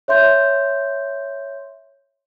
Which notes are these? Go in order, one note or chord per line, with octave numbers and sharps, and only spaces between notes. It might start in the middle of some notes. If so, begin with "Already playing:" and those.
C#5 E5 C6 G6